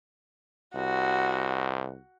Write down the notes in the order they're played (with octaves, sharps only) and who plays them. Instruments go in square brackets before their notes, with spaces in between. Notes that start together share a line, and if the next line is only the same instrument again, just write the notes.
[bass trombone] C2 [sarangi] F#4